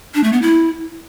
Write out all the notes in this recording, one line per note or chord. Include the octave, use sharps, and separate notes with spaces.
D4
A3
B3
E4